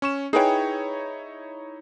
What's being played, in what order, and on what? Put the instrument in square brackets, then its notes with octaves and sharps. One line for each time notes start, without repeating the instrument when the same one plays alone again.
[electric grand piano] C#4 C#6 E7
[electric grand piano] D#4 E4 C#5 [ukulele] G#4 B4 G5